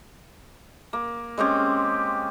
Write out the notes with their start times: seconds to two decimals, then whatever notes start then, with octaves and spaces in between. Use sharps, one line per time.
0.93 A#3
1.38 G#3 C4 C#4 G4